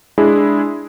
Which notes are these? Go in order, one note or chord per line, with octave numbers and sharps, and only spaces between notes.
G#3 D4 E4 G#4